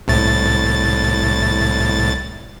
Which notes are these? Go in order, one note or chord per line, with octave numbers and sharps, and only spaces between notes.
C2 A2 A6